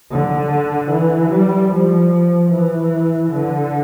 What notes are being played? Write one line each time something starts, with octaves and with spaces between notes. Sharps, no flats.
D3
E3
G3
F3
E3
D3